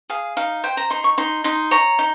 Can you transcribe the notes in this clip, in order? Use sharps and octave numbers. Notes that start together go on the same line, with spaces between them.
G#4 F5
D#4 F5
C5 G5
A#5
D#4 C6
C#6
D#4 C6
D#4 C6
C#5 A#5
D#4